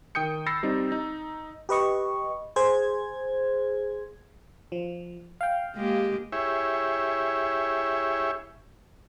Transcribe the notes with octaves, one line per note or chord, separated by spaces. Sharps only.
D#3 G5 D#6 G6 C#7
B5 E6 A6 A#6 C7 C#7
G3 C4 D#4
D#4
G4 B4 D#5 C#6
G#4 C5 G#6
F3
F5 G5
G#3 A#3 G4
E4 G4 G#4 C#5 E5